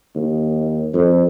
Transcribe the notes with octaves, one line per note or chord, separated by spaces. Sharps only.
D#2
F2